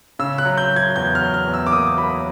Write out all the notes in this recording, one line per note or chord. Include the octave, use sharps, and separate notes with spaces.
C#3 E6
F#6
F#3
G6
F#3
G#6
E2 G6
F6
F#3
F6
E2
E6
D6
A#3 D#6
F#3 B5